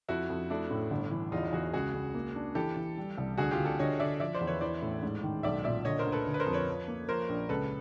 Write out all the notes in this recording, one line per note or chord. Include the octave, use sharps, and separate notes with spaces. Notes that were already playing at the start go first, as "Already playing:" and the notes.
F2 E4 F#4
F2
A3 D4 E4
A2
G1
E3
E2 D#4 F4
E2 F#4 G#4
C#2 F#4 G#4
C#2
A#3
D4
E3 G4 A4
E3
G3
C2
D2 F#4 G#4
F4 G4
D3
G4 A4
D3 C#5 D#5
D3 D5 E5
F3 D5 E5
C5 D5
E2
B4 C#5
E3 C5 D5
A2
G#2
D#3
B1 D5 E5
A#2 D5 E5
D3 C#5 D#5
A#4 C5
D2
A4 B4
D3
B4
A#4 C5
F2
B4 C#5
F3
A#3
F3 A#4 C5
A#1
C#2 A4 B4